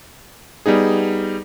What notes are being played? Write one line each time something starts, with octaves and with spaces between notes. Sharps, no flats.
G3 B3 D#4 G#4